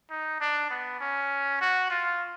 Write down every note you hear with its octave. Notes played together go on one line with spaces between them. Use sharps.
D#4
D4
B3
C#4
F#4
F4